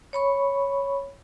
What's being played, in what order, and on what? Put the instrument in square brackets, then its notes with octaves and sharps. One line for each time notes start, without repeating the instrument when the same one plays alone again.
[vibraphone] C#5 B5 C#6